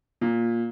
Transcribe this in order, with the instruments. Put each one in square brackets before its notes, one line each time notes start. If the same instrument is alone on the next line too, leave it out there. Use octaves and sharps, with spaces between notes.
[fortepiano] A#2